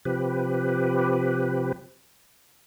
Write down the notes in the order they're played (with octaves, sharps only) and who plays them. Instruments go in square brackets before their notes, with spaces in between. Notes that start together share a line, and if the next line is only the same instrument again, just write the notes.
[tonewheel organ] C3 F3 G4 B4